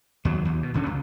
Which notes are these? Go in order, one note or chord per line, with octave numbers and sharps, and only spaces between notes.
D#2 F#3
D#2
B2
E1 D3 C#4
C#2